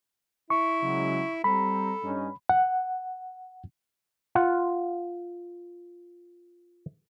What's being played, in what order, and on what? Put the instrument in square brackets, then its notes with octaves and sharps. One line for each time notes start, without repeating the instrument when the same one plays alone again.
[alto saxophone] E4 [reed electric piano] C#6
[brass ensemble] C#3 F#3 G#3
[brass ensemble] G3 C4 A#5 [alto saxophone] A4 [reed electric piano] B5
[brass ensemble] G2 C#4 D#4
[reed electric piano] F#5
[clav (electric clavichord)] F4 F#5